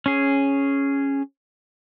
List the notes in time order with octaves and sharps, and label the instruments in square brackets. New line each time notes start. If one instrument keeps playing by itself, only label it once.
[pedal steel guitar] C#4 G#4